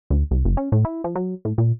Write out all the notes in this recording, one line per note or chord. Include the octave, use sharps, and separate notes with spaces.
D2
C2
F#1
C#4
A2
E4
F3
F#3
A2
A#2